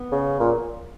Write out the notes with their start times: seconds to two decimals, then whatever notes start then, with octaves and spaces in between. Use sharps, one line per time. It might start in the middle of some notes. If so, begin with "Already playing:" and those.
Already playing: B3
0.12 C#3
0.40 A#2